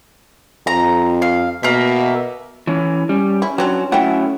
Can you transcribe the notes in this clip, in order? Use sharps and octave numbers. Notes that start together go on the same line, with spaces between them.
F2 A#5
F5
B2 A#3 E5
E3 C#4
G3 C#4
E4
E3 F#3 C4 D4
F#3 A3 E4 F#5 G5